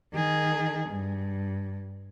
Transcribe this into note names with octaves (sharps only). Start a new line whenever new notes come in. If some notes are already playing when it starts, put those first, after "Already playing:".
D#3 G#4
G2